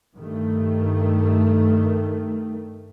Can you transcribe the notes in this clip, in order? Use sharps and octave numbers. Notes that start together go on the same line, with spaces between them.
G2 D#3 A3